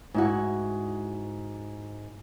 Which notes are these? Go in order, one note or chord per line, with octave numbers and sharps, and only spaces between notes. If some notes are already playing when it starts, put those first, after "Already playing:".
G#2 E4 F#4